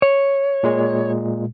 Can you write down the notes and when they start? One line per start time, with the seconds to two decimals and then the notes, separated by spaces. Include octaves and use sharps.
0.02 C#5
0.63 A#2 G#3